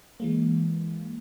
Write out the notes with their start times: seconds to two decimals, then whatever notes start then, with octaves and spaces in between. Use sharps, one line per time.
0.20 E3 G#3 A#3